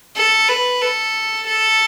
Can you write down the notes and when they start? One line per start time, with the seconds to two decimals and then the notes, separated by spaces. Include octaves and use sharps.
0.16 A4
0.49 B4
0.82 A4
1.47 A4